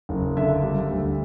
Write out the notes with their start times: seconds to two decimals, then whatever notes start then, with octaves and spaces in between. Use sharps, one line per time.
0.09 F#1
0.37 D3 E5
0.63 G3
0.91 D2